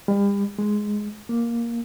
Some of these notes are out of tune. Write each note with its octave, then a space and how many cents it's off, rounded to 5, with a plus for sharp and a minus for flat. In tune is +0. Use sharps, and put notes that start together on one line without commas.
G3 +40
G#3 +5
A#3 +5